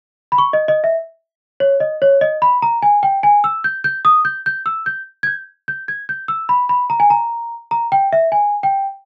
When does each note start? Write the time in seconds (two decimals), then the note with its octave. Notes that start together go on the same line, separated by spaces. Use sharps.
0.32 B5
0.38 C#6
0.53 D#5
0.68 D#5
0.84 E5
1.60 C#5
1.80 D#5
2.02 C#5
2.21 D#5
2.42 B5
2.62 A#5
2.82 G#5
3.03 G5
3.23 G#5
3.44 E6
3.64 G6
3.84 G6
4.05 D#6
4.25 G6
4.46 G6
4.66 E6
4.86 G6
5.23 G#6
5.27 G6
5.68 G6
5.88 G#6
6.09 G6
6.28 E6
6.49 B5
6.69 B5
6.90 A#5
7.00 G#5
7.10 A#5
7.71 A#5
7.92 G5
8.13 E5
8.32 G#5
8.63 G5